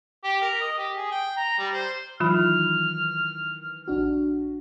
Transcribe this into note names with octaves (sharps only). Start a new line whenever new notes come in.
G4
A#4
D#5
G4
G#4
G5
A#5
G3
C5
D#3 E3 F#3 F4 B5 F6
A#1 D4 F#4